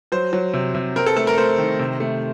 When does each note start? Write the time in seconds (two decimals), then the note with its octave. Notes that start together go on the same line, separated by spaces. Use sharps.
0.12 F#3 C5
0.33 F#3
0.54 C3
0.75 C3
0.96 C4 A#4
1.06 A4
1.16 A3 A4
1.27 A#4
1.38 A3 C5
1.58 D#3
1.80 C3
2.00 A3